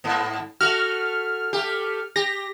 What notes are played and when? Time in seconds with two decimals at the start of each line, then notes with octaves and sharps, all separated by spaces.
0.04 G#2 B3
0.61 A3 F#4 F6
1.53 A3 G4
2.16 G4 A#6